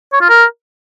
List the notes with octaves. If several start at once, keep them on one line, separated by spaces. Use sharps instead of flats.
C#5
F4
A#4